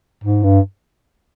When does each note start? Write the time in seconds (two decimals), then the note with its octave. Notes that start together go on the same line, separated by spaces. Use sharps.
0.24 G#2
0.44 G2